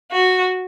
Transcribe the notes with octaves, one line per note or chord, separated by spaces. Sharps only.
F#4